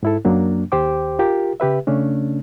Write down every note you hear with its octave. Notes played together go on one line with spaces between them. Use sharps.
G#2 E4 A4
F#2 F#3 A#3 D4
D#2 G4 C5 G5 D6
F4 G4 A#4
C#3 G4 B4 E5
C#3 A3 C#4 D4